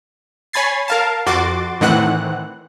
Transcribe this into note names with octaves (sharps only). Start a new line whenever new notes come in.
C#5 G#5 B5 G#6 A6 C7
A#4 F5 A5
F2 F#4 C6 D6 A6
A2 D#3 E3 C4 F#5 F#6